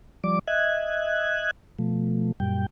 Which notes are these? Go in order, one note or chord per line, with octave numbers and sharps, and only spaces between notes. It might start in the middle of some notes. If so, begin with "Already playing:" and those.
F3 G3 D5 D6
D#5 E5 F#6 G#6
B2 F3 A3
F#2 A#2 G3 G5